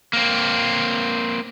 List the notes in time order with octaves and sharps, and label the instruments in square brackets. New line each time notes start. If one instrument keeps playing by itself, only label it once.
[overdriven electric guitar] A#3 C4